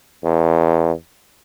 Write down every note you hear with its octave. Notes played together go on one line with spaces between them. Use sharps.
E2